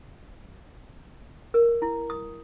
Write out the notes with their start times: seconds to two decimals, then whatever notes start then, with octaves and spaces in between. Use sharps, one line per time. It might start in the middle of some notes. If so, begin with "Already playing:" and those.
1.54 A#4
1.82 E4
2.10 D#6